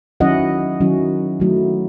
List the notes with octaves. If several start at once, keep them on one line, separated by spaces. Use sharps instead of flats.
D#3 F#3 C#4 E4 D#5 F#5
D#3 F#3 C#4 E4
D#3 F#3 A3 E4